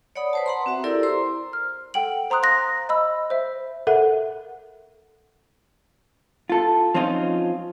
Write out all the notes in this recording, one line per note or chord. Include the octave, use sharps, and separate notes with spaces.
C#5 D5 F#5 B5 D#6
B4 C5 A5
F#5 A#5 C6
C4 F#4 E5
E4 G4 A4 A#4 D5 E6
C5 A#5 C6
F6
A4 F#5 G5 D7 F#7
C5 A#5 C6 D#6 F#6
F5 C6 F#6 A#6
D#5 B5 E6
C5 E5
A4 A#4 E5 F#5
F4 A4
F3 C4 C#4 D#4 F4